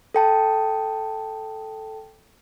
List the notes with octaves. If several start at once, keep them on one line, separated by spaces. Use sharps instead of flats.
A4 G5 A5